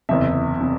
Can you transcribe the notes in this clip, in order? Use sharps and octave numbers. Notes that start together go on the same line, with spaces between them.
F#1 E2 C3 E5
C3